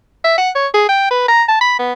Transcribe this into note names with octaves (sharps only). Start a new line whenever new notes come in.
E5
F#5
C#5
G#4
G5
B4
A#5
A5
B5
B3